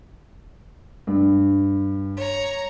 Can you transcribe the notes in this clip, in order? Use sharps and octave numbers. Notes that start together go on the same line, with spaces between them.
G2
C#5 A#5